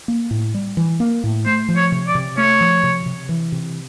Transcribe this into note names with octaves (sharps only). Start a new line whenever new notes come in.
A#3
A2
G3
E3
A#3
A2
A3 C5
F3
C#5
C3
D5
C3
A3 C#5
F3
C3
C3
E3
C3